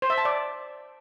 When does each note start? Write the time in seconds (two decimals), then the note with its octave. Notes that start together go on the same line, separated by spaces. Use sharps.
0.02 C5
0.10 E5
0.18 A5
0.25 D5